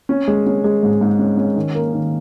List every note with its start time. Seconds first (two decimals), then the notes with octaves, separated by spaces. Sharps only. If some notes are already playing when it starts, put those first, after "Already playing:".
0.09 C#4
0.28 G#3
0.46 C#4
0.64 G#3
0.83 G#2
1.01 G#2
1.19 C#4
1.37 C#4
1.56 D#3
1.75 A#3
1.93 D#3